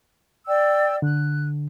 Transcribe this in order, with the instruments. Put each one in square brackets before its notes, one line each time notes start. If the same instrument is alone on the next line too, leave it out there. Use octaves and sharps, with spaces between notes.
[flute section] D5 G5 E6
[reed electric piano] D3 [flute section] F#6